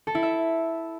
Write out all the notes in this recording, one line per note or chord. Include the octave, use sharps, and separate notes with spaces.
A4
E4
E5